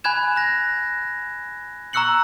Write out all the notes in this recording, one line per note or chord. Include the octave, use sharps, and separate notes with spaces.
G#5 B5 F#6 G#6 E7
F#6 A#6
A#5 C#6 E6 F#6 C#7 F#7